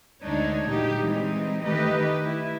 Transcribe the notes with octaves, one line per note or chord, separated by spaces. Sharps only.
D2 G#2 D3 D4 D#4 C#5
A#2 D3 E3 F#3 D#4 G4
E3 G3 G#3 C4 D#4
D#3 A3 D#4 G4 B4 D#5
E4